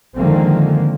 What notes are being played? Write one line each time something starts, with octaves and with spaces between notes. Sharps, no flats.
D3 D#3 F3 G#3 A#3 C4